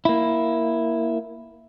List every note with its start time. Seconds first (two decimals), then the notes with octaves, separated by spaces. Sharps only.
0.05 A#3 E4